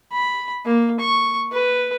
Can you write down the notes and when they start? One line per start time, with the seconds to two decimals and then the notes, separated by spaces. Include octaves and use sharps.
0.12 B5
0.65 A#3
1.00 C#6
1.52 B4